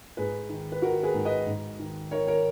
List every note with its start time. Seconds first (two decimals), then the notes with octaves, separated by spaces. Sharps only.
0.17 G#2 G#4 B4
0.49 D#3
0.72 B4
0.82 D#3 F#4 A#4
1.03 G#4 B4
1.14 G#2
1.25 B4 D#5
1.47 G#2
1.79 D#3
2.11 D#3 A#4 C#5
2.27 A#4 C#5